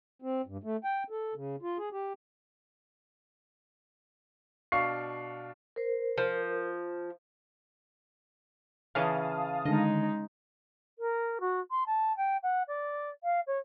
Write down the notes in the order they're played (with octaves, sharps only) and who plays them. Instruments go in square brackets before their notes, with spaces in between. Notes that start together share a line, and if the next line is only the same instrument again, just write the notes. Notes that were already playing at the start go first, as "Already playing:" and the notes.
[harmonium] C4
G2
A3
G5
A4
C#3
F4
G#4
G4
[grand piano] B2 D4 F5 C#6 C7
[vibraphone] A#4 C5
[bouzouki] F3
[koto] C#3 E3 [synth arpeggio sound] F5 A5 D#6
[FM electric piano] D3 D#3 [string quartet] G#3 D#4 [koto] D#5
[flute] A#4
F#4
C6
A5
G5
F#5
D5
F5
C#5